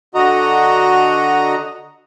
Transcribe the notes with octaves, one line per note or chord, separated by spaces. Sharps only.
D3 F#4 D#5 A#5